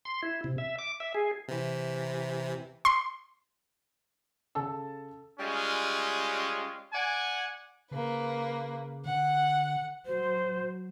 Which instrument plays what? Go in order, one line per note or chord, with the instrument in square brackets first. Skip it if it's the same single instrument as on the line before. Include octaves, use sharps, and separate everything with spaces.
[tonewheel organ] C6
E4
C3
E5
D6
E5
G#4
[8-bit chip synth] C3 E3
[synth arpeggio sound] C6
[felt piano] C#3 A4 A5 E6
[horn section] G3 G#3 C#4 F4
D5 F#5 G#5
[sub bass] C#3 [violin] A#3 B4
[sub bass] D3 [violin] F#5
[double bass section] F#3 [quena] C5